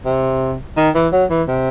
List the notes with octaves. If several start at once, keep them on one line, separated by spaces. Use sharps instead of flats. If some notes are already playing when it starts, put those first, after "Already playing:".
C3
D#3
E3
F#3
E3
C3